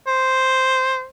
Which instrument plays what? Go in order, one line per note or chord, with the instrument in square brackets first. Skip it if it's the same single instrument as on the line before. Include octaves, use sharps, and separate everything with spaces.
[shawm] C5